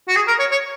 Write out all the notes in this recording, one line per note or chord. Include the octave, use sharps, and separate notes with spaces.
F#4
G#4
A#4
C#5
C#5